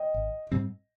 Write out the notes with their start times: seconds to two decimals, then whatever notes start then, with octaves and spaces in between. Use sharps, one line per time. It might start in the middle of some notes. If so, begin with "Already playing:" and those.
Already playing: D#5 G5
0.14 G#1
0.52 G#2 G3 C4